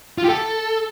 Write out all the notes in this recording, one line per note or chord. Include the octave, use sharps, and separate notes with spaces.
F4
G4
A4